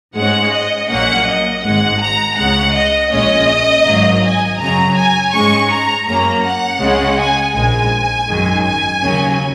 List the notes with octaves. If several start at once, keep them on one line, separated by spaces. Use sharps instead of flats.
G#2 G#3 C#4 F#5
D#5
A#1 A#2 F#3 A#3 C#4 F#5
D#5
G#1 G#2 G#3 F#5
A#5
C#2 C#3 G#3 F#5
D#5
A#1 A#2 G#3 C#4 D#5
G#1 G#2 F#3 A#3
G#5
F#2 C#3 F#3 A#5
G#5
G#2 G#3 C#4 C#6
A#5
F#2 F#3 A#3 C#4 A#5
F#5
C#2 C#3 G#3 C#4
G#5
A#1 G#2 G#3 G#5
G#1 F#2 D#3 G#3
G#5
D#2 C#3 F#3 C#4